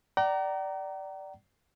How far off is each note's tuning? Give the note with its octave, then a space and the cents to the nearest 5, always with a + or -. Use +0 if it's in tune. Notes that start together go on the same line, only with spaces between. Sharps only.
D5 +0 G5 -45 A#5 +0